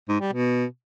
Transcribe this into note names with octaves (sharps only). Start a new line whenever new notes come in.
G#2
G3
B2